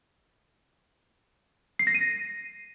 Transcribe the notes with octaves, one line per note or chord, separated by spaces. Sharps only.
C7
A#6
D#7